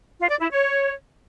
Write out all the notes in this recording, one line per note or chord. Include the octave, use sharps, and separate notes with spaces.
F4
D5
E4
C#5